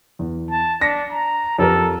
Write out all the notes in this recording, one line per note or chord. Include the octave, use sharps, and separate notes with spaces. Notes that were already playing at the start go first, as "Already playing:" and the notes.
E2
A5
D4 A#6 B6 C#7
A#5
F2 G4 A4 A#4